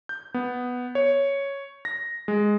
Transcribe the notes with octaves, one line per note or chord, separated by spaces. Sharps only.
G6
B3
C#5
A#6
G#3